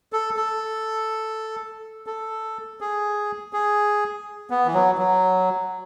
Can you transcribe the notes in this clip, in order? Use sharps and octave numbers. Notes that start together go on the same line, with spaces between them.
A4
A4
A4
G#4
G#4
B3
E3
F#3
F#3